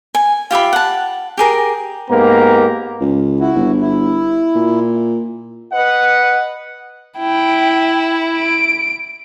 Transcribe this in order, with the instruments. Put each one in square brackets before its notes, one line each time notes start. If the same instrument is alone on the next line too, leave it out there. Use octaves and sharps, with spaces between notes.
[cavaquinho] G#5
F4 G4 E5 B5
F#5 A5
G4 G#4 A#4
[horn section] G#2 A#3 B3 G4 A#5
[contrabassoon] C#2
[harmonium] E4 F#4
[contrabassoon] G1
[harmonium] E4
[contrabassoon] A#2
[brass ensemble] B4 D#5 F#5
[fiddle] E4 [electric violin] G5
[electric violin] D7